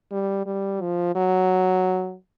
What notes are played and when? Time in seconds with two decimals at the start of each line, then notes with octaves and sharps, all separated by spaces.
0.12 G3
0.46 G3
0.82 F3
1.15 F#3